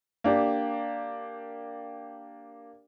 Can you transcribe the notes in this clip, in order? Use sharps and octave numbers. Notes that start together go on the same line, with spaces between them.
A#3 D4 G4